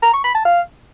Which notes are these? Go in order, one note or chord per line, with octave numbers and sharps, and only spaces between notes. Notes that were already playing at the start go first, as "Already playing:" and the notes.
A#5
C#6
B5
A5
F5